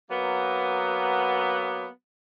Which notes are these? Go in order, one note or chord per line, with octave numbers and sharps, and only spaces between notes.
F#3 A#3 B3